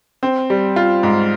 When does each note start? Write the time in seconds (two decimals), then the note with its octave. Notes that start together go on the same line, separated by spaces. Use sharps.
0.23 C4
0.50 G3
0.76 F4
1.03 G#2